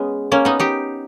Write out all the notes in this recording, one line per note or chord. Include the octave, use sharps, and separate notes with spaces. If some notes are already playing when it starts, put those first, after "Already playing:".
Already playing: G#3 B3 C#4
A#3 C#4
B3 D#4
D#4 G4